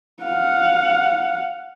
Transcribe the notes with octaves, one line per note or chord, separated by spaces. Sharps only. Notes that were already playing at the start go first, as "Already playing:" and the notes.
F5 F#5